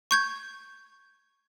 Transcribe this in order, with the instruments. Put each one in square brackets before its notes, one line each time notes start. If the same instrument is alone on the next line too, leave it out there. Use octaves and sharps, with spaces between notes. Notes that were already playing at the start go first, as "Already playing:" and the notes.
[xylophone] C#6 G6 G#6